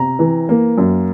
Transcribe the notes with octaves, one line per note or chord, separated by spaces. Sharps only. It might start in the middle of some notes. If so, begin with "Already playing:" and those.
Already playing: C3 A#5
E3
A#3
F#2